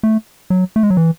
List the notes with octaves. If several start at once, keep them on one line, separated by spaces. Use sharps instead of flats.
A3
F#3
A3
G#3
F#3
E3